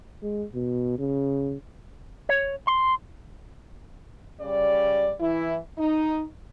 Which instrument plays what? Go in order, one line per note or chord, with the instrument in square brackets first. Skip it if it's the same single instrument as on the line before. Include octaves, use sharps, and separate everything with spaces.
[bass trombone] G#3
B2
C#3
[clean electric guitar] C#5
C6
[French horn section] C#3 G3 D5
E3 E4
D#4